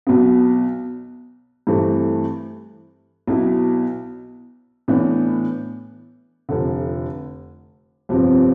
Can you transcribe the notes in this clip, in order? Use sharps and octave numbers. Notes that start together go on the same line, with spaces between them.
B1 B2 B3
G2 E3 A3 C4
B1 B2 B3 E4
A2 E3 B3 D4
F1 F2 D3
G1 F2 C3 F3 C4